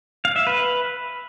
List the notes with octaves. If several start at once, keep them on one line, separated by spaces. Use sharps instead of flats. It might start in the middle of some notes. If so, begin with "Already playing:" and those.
F5
E5
B4